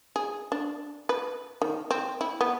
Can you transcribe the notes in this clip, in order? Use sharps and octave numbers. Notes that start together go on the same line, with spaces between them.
G#4
D4
B4
D#3
C4
E4
B3